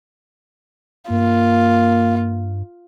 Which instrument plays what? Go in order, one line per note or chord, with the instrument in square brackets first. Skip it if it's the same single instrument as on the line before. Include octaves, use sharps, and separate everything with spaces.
[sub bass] G2 [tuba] A#3 [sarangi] F4